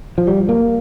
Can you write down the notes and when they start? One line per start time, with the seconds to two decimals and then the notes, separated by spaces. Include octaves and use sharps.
0.18 F3
0.27 G3
0.49 A#3